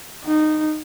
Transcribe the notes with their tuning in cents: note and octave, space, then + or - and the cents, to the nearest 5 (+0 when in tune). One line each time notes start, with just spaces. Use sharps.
D#4 -15